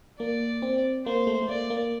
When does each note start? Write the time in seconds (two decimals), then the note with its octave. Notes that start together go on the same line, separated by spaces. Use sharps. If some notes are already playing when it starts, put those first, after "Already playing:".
0.20 A#3 D5
0.62 C4
1.06 A#3 C5
1.27 A3
1.42 A3
1.49 A#3 D5
1.70 A#3